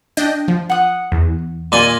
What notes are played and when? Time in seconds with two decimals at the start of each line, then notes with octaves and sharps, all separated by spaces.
0.17 D4 D#5 G5
0.48 F3
0.70 F#5 D#6
1.12 E2
1.72 A#2 D5 D#5 G#5 C6